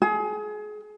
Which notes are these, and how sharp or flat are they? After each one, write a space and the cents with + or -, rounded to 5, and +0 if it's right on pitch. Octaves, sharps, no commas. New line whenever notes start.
G#4 +30